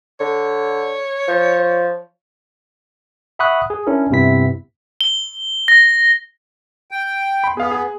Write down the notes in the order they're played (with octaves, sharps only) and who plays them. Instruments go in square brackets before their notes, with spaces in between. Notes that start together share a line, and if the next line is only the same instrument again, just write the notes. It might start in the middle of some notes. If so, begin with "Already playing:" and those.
[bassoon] D3 [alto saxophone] C#5
[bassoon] F3
[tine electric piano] E5 F#5 B5 C#6 D#6 F#6
G#4
C#4 D4 E4 A#4
G2 C3 B3 E4 B6
[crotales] G7
A#6
[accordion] G5
[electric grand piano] B5 C6
[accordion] B3 [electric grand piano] G#4 F5
[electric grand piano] G#4